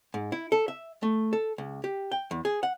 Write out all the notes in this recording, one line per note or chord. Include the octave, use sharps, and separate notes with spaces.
G#2
E4
A4
E5
A3
A4
C#2
G4
G5
E2
G#4
F#5